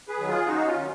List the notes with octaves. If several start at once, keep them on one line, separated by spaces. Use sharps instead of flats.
G#4 B4
D#3 F#3
F4 G#4
F#2 D#4 F#4
C#4 F4
D#3 F#3